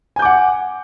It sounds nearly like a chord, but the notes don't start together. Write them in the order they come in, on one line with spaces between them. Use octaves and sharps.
G#5 G6 D6 F#5